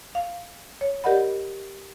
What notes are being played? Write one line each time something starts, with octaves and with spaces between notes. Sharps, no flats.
F5
C#5
G4 A#4 D5 D#5 F#5 B5